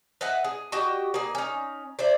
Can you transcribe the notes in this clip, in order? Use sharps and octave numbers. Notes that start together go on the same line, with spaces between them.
B4 D#5 E5 F#5
G#4
F#4 G4 D#5 G5
A#3 G#4
C#4 D#4
C5 D5 E5